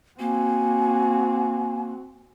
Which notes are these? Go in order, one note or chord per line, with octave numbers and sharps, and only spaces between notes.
A#3 C4 F#4 G#5